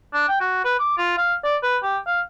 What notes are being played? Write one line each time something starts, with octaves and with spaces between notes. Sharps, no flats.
D4
G5
F#4
B4
D6
F4
F5
D5
B4
G4
F5